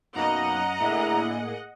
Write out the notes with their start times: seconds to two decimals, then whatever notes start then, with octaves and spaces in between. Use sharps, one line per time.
0.15 F#2 B2 A#3 D#4 D#5 F#5 A#5
0.80 A2 D3 A#3 D4 E4 G#4